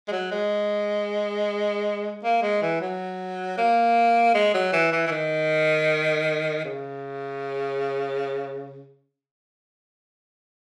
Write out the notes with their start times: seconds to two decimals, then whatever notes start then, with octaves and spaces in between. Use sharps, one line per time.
0.08 G#3
0.12 F#3
0.31 G#3
2.24 A#3
2.42 G#3
2.62 E3
2.81 F#3
3.58 A#3
4.34 G#3
4.54 F#3
4.73 E3
4.92 E3
5.07 E3
5.11 D#3
6.65 C#3